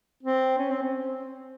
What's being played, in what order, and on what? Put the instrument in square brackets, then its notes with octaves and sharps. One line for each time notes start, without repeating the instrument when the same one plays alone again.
[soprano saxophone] C4
C#4
C4
C4